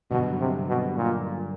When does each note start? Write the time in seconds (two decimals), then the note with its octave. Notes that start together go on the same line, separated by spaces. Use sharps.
0.11 G2 B2 D3 F#3
0.39 C3
0.68 B2
0.97 A#2